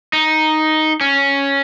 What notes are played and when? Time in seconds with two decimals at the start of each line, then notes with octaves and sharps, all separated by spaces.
0.13 D#4
1.01 C#4